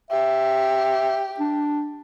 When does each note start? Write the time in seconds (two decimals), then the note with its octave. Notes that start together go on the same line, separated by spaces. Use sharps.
0.11 G4 E5
1.40 D4